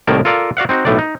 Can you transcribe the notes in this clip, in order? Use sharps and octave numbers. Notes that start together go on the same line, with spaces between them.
C2 A2 D#3 A#3 A#4 A5
F4 A4 A#4 D5 F5
F#4 D5 F5 F#5
C4 D#4 F#4
B1 A2 A3 D4 D5
D#4